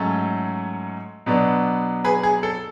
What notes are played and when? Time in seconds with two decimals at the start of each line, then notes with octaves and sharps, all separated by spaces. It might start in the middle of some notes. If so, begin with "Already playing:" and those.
Already playing: G#2 F#3 A3 C#4 A4
1.26 B2 F#3 B3 D4
2.04 G#4 B4
2.23 G#4
2.43 A4